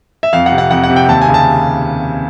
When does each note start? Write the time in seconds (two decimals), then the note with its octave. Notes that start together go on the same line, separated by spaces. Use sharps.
0.23 E5
0.33 F2 F5
0.46 F#5
0.52 C3
0.58 F#5
0.71 F2 F#5
0.84 F#5
0.90 C3
0.96 G5
1.08 D#2 A5
1.22 G#5
1.29 C#3
1.34 A5